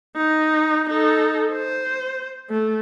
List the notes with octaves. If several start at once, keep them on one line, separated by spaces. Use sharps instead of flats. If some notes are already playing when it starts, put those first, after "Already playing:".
D#4
D#4 A4
C5
A3